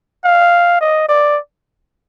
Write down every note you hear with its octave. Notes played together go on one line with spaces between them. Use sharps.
F5
D#5
D5